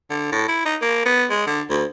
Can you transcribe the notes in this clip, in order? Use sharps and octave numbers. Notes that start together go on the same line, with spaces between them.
D3
A2
E4
D#4
A#3
B3
G#3
D3
D2